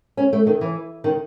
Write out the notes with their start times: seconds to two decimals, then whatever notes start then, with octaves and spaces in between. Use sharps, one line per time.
0.17 C#4
0.33 A3
0.47 D#3
0.61 E3
1.04 D#3